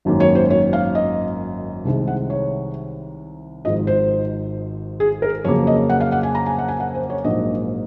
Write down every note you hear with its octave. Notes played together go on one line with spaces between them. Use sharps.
G#1 F#2 D#3 A#3
C#5
C5
C#5
F5
D#5
C2 C3 D#3 G#3
F#5
C#5
G#1 G#2 F3 D#5
C5
G#4
A#4
F2 C#3 F#3 A#3 C#5
D#5
F#5
F5
F#5
G#5
A#5
G#5
F#5
G#5
F#5
C5
C#5
A#1 G#2 F#3 A#3 D#5